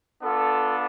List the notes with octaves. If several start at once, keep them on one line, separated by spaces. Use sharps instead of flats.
B3 D4 F4 A4